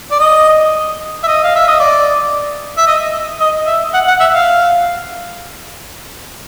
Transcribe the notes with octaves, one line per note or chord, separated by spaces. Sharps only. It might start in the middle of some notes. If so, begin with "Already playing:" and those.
D5
D#5
E5
D#5
F5
E5
D#5
D5
E5
D#5
D#5
E5
F#5
F#5
E5
F5